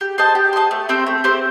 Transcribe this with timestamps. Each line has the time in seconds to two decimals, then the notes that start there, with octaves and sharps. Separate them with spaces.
0.01 G4
0.18 C5 D#5 A5
0.35 G4
0.53 C5 D#5 A5
0.71 A3
0.89 C4 G4 C5
1.06 A3
1.24 C4 G4 C5